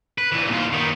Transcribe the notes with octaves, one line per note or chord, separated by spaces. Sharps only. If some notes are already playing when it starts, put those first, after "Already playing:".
B4
A#2 E3
D#2 F4
D#3 B3